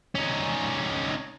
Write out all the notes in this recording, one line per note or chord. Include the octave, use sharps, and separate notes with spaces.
C#4 D#4